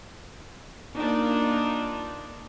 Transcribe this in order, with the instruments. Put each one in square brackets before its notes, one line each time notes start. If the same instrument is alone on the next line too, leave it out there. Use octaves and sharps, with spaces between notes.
[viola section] A#3 D4 D#4 F4